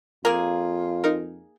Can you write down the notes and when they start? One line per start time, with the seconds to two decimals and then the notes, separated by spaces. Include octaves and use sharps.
0.25 F2 A#3 F4 G#4 A#4
1.04 D#4 A#4